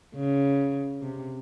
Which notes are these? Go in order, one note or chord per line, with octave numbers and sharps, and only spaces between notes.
C#3
C3